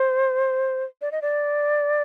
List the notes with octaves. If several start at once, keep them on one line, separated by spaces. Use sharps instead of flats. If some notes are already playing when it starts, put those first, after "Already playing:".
Already playing: C5
D5
D#5
D5